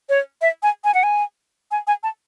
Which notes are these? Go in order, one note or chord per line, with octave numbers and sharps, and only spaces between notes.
C#5
E5
G#5
G#5
F#5
G#5
G#5
G#5
A5